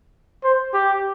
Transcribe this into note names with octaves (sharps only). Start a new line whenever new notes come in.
C5
G4